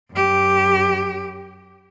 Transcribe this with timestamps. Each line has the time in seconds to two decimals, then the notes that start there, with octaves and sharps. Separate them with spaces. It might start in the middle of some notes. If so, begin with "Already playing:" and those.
0.11 F#2 G4